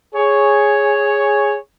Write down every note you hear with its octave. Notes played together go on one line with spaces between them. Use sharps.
G#4 C#5